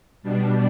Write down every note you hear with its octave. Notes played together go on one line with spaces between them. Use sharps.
B2 G3 D4